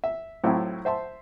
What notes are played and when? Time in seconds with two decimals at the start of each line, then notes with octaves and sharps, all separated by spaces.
0.04 E5
0.44 A2 F#3 C4 E4 F4
0.85 C5 E5 A5 C6